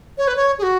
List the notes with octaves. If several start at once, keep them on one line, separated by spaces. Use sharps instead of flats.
C#5
B4
C#5
G#4
F#4